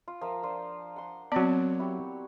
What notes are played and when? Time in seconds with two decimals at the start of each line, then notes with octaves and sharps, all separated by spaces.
0.08 F4
0.21 F3 A#4 E5
0.43 D4 F4 C5
0.96 F#5 C6
1.32 F#3 B3 C4 D5
1.79 E4 F#4 G4